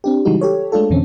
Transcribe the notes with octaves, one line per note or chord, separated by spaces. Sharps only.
C4 D4 G4
C#3 E3 G3 G#3 D#4 F#4
G4 A4 C#5
G#3 A3 D4 F4 A4
F2 B2 D3 E3 C4 C#4